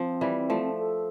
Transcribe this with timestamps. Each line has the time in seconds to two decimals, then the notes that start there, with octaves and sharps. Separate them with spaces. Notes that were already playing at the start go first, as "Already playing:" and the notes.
Already playing: F3 C4
0.21 E3 G3
0.50 F3 A3
0.79 A4